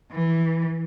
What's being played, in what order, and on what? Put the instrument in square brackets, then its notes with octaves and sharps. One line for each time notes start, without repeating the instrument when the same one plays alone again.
[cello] E3